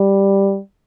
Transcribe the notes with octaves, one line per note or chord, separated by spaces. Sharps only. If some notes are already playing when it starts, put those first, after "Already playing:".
Already playing: G3